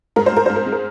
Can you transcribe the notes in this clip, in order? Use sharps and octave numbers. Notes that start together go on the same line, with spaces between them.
G#2 A#4
C5
G#2 A#4
G#2 C5
A#4
G#3
A#4